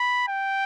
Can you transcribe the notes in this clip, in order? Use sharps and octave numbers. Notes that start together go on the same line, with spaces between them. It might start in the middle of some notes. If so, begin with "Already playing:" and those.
Already playing: B5
G5